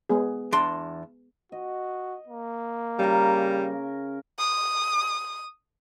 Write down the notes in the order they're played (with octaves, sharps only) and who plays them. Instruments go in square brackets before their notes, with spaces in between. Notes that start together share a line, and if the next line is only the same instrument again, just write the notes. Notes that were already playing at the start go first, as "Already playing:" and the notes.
[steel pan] G#3 B3 G#4
[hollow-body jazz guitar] E2 D4 C6
[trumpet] F#4 [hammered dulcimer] D#5
[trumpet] A#3
[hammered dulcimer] C#3 A#4 [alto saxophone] G3
[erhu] D#6